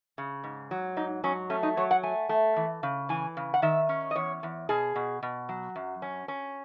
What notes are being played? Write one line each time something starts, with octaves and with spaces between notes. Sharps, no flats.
C#3
G#2
F#3
G#2 D#4
F#3 C#4
A3 C#4
D#4
F#3 C#5
F#5
A3 G#5
A3
E3
C#3
E3 G#5
C#3
F#5
D#3 E5
C#4
D#5
E2 C#5
E2
B2 G#4
B2
B2
F#3
F#2
C#4
C#4